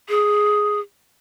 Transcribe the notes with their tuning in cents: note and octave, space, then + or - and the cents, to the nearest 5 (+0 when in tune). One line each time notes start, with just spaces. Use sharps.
G#4 +0